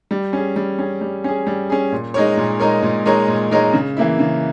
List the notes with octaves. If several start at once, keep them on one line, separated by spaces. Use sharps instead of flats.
G3
C#4 G#4
G3
C#4 G#4
G3
C#4 G#4
G3
C#4 G#4
A#2
G#3 D#4 A#4 C#5
A#2
G#3 D#4 A#4 C#5
A#2
G#3 D#4 A#4 C#5
A#2
G#3 D#4 A#4 C#5
C#3
E3 A#3 E4
C#3